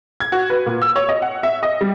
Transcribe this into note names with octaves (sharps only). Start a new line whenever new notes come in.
G#6
F#4
B4
A#2
E6
C#5
D#5
F#5
E5
D#5
G3